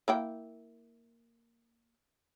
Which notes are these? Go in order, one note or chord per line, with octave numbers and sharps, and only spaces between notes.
A#3 E4 G5